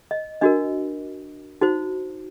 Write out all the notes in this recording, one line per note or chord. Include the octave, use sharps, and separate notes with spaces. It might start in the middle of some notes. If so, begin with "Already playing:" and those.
D#5
D4 F#4 A#4 D#5
D#4 F#4 C5